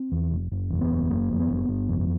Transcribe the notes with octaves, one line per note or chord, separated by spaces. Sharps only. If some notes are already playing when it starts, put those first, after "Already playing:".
Already playing: C4
E2
F1
F#1
E2
B3
F#1
F#1 A#3
F2
B3
F#1
G1
F2